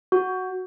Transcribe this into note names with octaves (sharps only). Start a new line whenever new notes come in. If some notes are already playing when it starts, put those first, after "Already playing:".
F#4